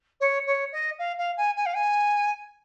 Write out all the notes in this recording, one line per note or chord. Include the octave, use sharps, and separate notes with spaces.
C#5
C#5
D#5
F5
F5
G#5
G#5
F5
G#5